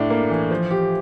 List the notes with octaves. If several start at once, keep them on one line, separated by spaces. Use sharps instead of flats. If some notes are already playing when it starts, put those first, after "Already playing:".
Already playing: A2 D4
A#3
E3
F3
G4